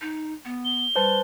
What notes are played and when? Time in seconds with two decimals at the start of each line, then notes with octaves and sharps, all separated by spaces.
0.01 D#4
0.45 B3
0.65 G7
0.96 G3 B4 C5 A5